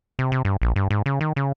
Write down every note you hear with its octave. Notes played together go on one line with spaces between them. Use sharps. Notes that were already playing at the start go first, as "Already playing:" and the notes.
C3
C3
G2
A#1
G2
G#2
C#3
D#3
C#3